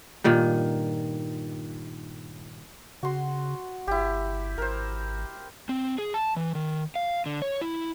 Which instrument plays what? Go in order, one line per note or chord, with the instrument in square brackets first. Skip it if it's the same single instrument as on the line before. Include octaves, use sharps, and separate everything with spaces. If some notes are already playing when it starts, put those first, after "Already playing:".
[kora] G2 A#2 D#3
[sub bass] C#3 [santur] F#4 C6
[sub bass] G1 [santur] E4 G4
[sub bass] G#1 [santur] A#4 C5
[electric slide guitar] C4
G#4
A5
E3
D#3
F5
D3
C#5
E4